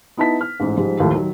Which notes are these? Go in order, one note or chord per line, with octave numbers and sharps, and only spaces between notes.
B3 D#4 E4 A5 B6
F6
A1 G#2
G#2 F3 G3 G#3
D#2 A2 D#3 F3
D#3 F#3 F#4